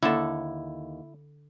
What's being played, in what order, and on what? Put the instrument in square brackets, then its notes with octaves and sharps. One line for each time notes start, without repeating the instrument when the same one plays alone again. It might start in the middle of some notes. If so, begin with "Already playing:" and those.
[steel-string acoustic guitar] D#2 [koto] D3 A4 [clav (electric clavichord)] E4